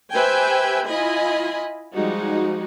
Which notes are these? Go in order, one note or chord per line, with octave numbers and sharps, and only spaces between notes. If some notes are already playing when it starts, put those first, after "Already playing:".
G4 B4 C5 E5 G5 G#5
E4 F4 D#5 G#5 B5
F3 G3 G#3 D#4 F#4